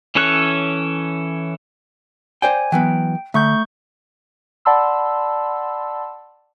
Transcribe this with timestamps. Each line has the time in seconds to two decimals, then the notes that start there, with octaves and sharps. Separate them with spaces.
0.15 E3 C#4 A4 C#5 F#6
2.42 C5 D5 G5 G#5
2.72 E3 F#3 B3 G5
3.34 D3 A3 C#6 G6
4.65 D5 F#5 A5 B5 C6 E6